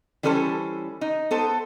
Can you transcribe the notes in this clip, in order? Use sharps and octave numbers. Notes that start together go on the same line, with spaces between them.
E3 G3 C#4 A4 B4 C5
D#4
B3 A4 C5